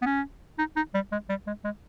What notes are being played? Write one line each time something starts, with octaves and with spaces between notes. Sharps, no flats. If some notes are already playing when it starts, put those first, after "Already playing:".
B3
C#4
D#4
D#4
G3
G#3
G3
G#3
G#3